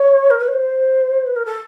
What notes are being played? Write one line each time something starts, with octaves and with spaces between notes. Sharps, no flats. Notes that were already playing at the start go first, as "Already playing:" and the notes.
Already playing: C#5
A#4
B4
C#5
C5
B4
A#4
A4